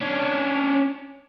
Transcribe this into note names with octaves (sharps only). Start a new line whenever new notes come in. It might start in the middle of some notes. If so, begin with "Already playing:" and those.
C#4 D4